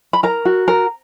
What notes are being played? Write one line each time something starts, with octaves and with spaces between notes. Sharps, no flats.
B5
A#4 A#5
F#4
A#4